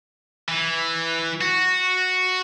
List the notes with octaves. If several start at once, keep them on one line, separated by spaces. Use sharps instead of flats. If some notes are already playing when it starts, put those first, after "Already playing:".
E3
F#4